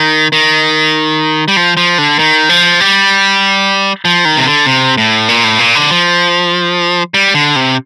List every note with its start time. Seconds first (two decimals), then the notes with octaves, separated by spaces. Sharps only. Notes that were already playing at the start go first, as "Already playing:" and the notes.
Already playing: D#3
0.32 D#3
1.48 G3
1.57 F3
1.77 F3
1.98 D3
2.19 D#3
2.49 F3
2.80 G3
4.05 F3
4.25 D#3
4.37 C3
4.46 D3
4.66 C3
4.97 A2
5.28 A#2
5.44 A2
5.59 A#2
5.75 D3
5.91 F3
7.14 G3
7.34 D3
7.56 C3